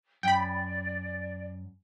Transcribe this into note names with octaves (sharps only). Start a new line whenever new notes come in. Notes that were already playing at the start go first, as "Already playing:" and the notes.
F#2 D5 G5 B5